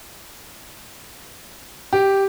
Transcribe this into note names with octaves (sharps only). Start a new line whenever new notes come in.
G4